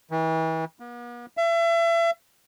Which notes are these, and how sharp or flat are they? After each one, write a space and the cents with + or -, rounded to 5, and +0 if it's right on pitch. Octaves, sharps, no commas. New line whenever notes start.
E3 -35
B3 -45
E5 +35